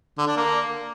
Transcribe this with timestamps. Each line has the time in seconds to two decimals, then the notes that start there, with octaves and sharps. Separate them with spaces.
0.18 D3
0.27 D4
0.37 A#3